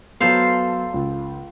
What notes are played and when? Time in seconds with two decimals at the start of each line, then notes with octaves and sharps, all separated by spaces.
0.21 F#3 B3 A4 C5 F5
0.94 C#2